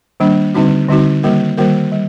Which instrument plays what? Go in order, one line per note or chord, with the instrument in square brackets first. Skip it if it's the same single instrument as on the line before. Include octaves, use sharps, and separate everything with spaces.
[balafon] D#3 G3 A#3 D4
D3 G3 C4 D#4 F#4
D3 G3 C4 D#4 F#4
D#3 G3 A#3 F#4 A#4
D#3 G3 A#3 F#4 A#4
G3